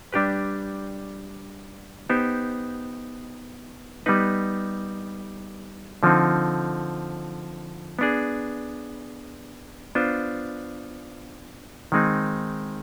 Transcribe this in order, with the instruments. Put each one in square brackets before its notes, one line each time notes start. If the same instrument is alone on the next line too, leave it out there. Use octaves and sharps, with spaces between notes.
[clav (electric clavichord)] G3 D4 G4 B4
B3 D#4 G4 C5
G3 B3 D#4 B4
D3 F3 C4 D#4
B3 D4 G#4
B3 D4 F4 C5
D#3 G#3 C4 D#4